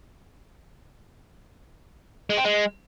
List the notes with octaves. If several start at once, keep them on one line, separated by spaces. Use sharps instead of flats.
G#3
C4
G#3